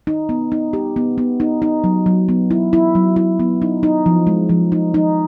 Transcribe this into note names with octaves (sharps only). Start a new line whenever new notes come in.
D#4
B3
D#4
G4
B3
B3
D#4
D#4
F#3
F#3
B3
E4
E4
F#3
E4
B3
D#4
D#4
F3
G#3
F3
D#4
D#4